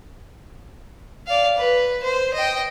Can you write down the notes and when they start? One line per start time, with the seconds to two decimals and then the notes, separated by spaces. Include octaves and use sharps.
1.27 D5 F5
1.57 B4
2.03 C5
2.34 D#5 G5